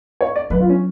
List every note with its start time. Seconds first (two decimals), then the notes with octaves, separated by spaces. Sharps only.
0.21 C#5
0.36 D5
0.50 F#3 B4
0.60 F4
0.70 C#4